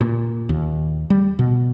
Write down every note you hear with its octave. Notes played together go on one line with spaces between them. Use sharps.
A#2
D#2
G3
B2